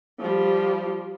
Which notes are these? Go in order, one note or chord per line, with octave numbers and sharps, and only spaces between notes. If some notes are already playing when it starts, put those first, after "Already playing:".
F3 G3